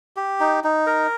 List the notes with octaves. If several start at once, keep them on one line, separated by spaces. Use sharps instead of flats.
G4
D#4
D#4
A#4